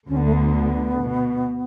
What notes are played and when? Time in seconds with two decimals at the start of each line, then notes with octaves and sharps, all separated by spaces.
0.09 D2 D3 C#4
0.17 B3
0.25 A3
0.33 B3
1.02 B2